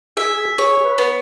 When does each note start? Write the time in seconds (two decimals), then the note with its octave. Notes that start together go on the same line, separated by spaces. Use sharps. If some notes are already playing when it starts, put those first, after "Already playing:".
0.17 G#4 E5
0.58 G#4 C#5
0.84 B4
0.98 B3